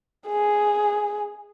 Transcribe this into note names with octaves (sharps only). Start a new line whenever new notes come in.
G#4